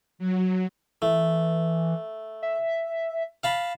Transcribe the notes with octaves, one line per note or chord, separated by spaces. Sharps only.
F#3
E3 A3
E5
F5 A5 B5